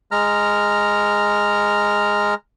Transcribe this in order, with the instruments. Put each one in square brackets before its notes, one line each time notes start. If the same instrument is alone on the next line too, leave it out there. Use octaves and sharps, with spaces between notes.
[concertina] G#3 A#5 F6